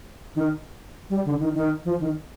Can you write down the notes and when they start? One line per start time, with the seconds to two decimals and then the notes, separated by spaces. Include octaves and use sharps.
0.35 D#3
1.10 G3
1.25 D3
1.40 D#3
1.54 D#3
1.85 F3
2.00 D#3